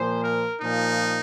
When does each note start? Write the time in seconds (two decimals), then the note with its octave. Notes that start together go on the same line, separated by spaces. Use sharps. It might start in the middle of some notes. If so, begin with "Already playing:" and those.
Already playing: A#2 F3 C5
0.23 A#4
0.59 A#2 F3 D#4